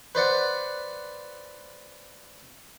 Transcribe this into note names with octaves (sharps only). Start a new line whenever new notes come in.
B4 C5 D5 F#5